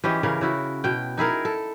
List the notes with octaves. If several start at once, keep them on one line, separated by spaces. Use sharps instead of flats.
E3 C#4 G4 D#5
C#3 E3 A#4
C#3 E4 F#4
B2 G5
D#4 E4 G#4 A#4
A4